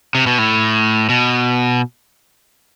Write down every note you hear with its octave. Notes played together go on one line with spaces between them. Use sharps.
C3
B2
A2
B2